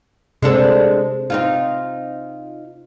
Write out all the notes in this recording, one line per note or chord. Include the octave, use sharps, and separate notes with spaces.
C3 G#3 D4 A4 C5
C4 D#4 F4